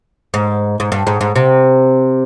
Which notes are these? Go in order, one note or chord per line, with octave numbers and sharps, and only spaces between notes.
G#2
G#2
G2
G#2
G#2
C3